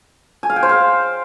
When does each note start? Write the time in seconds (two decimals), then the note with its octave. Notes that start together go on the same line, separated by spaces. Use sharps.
0.43 G#5
0.50 F5
0.56 G5
0.63 C5
0.69 F5